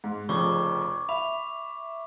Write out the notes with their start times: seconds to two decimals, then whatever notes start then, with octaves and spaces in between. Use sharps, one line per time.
0.04 G#2
0.29 F1 F2 C#3 C#6 D6
1.09 E5 B5